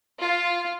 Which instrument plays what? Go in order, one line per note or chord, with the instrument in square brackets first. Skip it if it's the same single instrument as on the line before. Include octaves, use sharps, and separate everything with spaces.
[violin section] F4